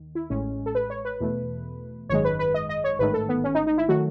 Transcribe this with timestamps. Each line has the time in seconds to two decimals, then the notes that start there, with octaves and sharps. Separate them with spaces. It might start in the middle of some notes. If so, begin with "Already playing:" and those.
Already playing: D#2 D#3
0.15 E4
0.30 A1 A2 G#3 C#4
0.66 A4
0.75 B4
0.90 C#5
1.05 B4
1.20 E2 B2 A3
2.09 G#1 F#2 D#3 G#3 C#5
2.24 B4
2.39 B4
2.54 D#5
2.69 D#5
2.84 C#5
2.99 A1 G#2 D#3 A3 B4
3.14 A4
3.29 B3
3.44 C#4
3.55 D#4
3.67 D#4
3.78 E4
3.88 D#3 F#3 A3 F#4